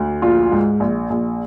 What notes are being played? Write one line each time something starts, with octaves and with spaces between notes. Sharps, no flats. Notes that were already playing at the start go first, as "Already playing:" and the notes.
Already playing: D2
A#1 F4
G#2
A#1
A#1